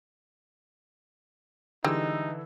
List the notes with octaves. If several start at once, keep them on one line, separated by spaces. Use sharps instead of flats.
D3 E3 G3 G#3 D#4 E6